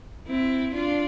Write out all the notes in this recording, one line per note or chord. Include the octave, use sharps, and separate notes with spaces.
C4 E4
D4 F4